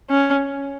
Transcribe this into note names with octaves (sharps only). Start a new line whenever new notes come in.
C#4